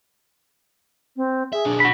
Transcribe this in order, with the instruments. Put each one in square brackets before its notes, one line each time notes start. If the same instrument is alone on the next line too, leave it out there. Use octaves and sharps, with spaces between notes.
[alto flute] C4
[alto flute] G#4 [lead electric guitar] E5
[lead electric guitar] B1 D4
[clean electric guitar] F#4 B5